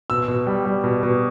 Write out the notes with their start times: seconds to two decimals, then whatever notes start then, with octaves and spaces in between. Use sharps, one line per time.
0.10 B2 E6
0.28 B2
0.47 G3
0.65 G3
0.84 B2
1.03 B2